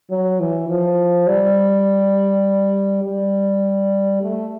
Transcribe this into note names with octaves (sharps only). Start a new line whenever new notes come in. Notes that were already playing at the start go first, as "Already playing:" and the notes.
F#3
E3
F3
G3
G3
A3